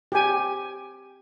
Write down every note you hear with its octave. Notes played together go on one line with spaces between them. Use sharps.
G4 G#5